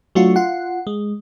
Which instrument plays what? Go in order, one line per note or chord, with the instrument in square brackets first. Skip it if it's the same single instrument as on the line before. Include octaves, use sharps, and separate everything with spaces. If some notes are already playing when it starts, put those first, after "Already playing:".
[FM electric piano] F#3 A3 D4 F4 F#4
F4 F#5
G#3